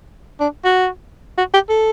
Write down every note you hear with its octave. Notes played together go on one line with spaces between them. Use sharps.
D4
F#4
F#4
G4
A4